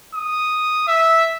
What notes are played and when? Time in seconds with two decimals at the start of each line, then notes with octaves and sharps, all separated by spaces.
0.15 D#6
0.88 E5